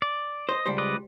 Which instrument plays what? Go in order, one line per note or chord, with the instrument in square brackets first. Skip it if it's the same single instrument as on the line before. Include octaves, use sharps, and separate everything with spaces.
[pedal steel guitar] D5
[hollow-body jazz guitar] C5 [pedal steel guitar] D#5
[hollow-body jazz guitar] C#2 G3 C5
[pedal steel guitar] B4 D5 D#5